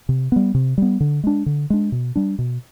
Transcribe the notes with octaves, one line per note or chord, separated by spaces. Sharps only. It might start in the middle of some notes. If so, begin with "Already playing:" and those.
C3
G3 B3
C3
G3 B3
D3
G#3 D4
D3
G#3 D4
B2
G3 D4
B2